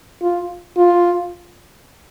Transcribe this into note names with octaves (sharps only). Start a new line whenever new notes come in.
F4
F4